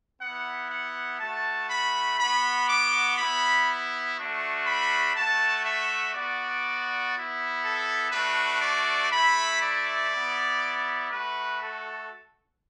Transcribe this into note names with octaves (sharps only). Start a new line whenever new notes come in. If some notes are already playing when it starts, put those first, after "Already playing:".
B3 E4 F#5
F#5
A3 F#4 A5
B5
B3 F#4 B5
D6
B3 E4 B5
A3 D4 F#4
B5
A3 F#4 A5
E5
B3 F#4 D5
B3 E4
A4
A3 D4 F#4 B4
D5
A3 E4 B5
D5
B3 E4
A3 F#4 B4
A4